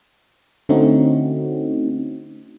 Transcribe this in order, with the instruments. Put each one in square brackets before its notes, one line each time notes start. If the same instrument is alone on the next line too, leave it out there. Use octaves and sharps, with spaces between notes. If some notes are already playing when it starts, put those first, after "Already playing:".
[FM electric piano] D3 A3 C4 C#4 D#4 F#4